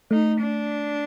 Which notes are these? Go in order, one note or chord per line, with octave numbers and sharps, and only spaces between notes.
A3 D#4
D4